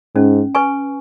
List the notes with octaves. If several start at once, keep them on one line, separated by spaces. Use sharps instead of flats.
G#2 C#4
B4 G#5 C#6